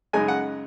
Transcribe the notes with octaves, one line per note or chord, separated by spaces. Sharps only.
F#2 C#3 G#3 D#4 G#5
F#5